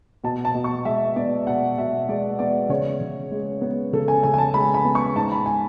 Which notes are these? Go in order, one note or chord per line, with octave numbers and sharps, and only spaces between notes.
B2 A5
A5
B2
C#6
G#3 E5
B3 D5
B2 F#5
B2 E5
G#3 D5
B3 D5
C#3 C#5
C#3
G#3
B3
C#3 A4
G#5
C#3 G#5
G#5
A5
G#3 B5
B5
B3
C#6
G#2 A5
B5
G#5